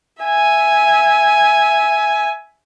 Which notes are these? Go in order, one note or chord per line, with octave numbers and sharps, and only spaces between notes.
E5 G#5